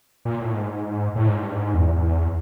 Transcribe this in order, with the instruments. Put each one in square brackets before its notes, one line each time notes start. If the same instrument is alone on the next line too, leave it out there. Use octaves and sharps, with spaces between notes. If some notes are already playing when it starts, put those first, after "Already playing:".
[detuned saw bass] A#2
A2
G#2
A2
G#2
G2
G#2
E2